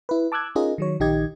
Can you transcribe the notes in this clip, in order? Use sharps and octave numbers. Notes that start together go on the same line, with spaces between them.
E4 B4
A5 D6 E6 F#6 G#6
C#4 D#4 F4 G#4 A#4 D#5
D#3 F#3 C#5
A#1 D#3 D#4 G4 D#5 G#6